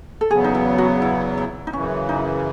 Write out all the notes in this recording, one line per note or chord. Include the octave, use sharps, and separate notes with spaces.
A4
E2 C#3 F#3 B3 G#4
D#4
E4
F#4
E4
E4
D#4
F#2 C#3 E3 C#4
D#4